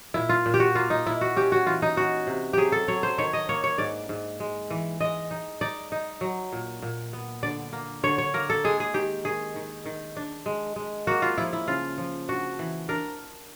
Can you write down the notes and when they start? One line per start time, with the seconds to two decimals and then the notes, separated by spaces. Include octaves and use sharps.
0.14 A#2 E4
0.29 F4
0.46 A#2
0.54 G4
0.60 F#4
0.75 A#3 F4
0.90 D#4
1.06 A#2 E4
1.21 F#4
1.36 C#4 G4
1.52 F#4
1.66 E3 F4
1.82 D#4
1.96 C#4 F#4
2.27 C3
2.53 F#3 G4 G#4
2.72 A4
2.88 F#3 C#5
3.03 C5
3.18 D#3 C#5
3.33 D#5
3.49 A#3 C#5
3.64 C#5
3.78 G#2 D5
4.09 G#2
4.40 G#3
4.71 E3
5.00 G#3 D#5
5.31 D#4
5.61 D#4 D5
5.92 D#4
6.21 F#3
6.53 A#2
6.83 A#2
7.13 B3
7.43 D3 D5
7.73 A#3
8.03 D3 C#5
8.18 C#5
8.34 A#3 A#4
8.50 A4
8.64 G#3 G#4
8.80 G#4
8.94 D#3 G4
9.25 D#3 G#4
9.56 D#3
9.86 D#3
10.17 D4
10.46 G#3
10.76 G#3
11.07 A#3 F#4
11.22 F4
11.38 F3 E4
11.53 E4
11.68 C#3 F4
11.98 F3
12.29 D4 F#4
12.59 E3
12.89 D4 A#4